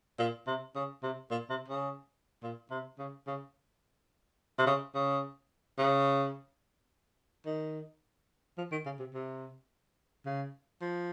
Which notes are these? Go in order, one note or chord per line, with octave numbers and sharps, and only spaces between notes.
A#2
C3
C#3
C3
A#2
C3
C#3
A#2
C3
C#3
C#3
C3
C#3
C#3
C#3
D#3
F3
D#3
C#3
C3
C3
C#3
F3